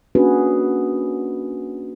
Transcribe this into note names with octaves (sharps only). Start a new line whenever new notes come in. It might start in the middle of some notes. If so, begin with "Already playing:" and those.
A#3 C#4 D4 F#4 G#4 B4